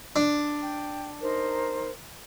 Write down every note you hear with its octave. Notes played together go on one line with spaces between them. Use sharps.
D4
G5
D#4 A#4 C5